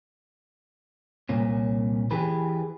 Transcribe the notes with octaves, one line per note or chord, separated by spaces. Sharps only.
C2 A#2 C#4
E3 G4 G#4 B4